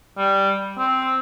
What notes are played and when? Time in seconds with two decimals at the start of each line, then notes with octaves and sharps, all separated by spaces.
0.17 G3
0.78 C4